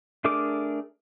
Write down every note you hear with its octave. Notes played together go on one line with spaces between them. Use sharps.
A3 D4 G#4 A#4 D6